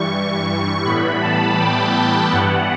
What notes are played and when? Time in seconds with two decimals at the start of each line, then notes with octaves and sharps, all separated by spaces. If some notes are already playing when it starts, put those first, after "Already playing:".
Already playing: G2 E3 G3 C#6
0.11 C#6
0.85 A2 E3 G3 B3 B5
1.22 A5
1.59 G5
1.95 G5
2.32 G2 E3 G3 B3 F#5